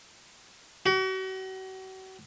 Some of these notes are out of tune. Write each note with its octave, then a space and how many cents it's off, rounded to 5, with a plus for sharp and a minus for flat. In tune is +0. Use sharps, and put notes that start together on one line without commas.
F#4 +40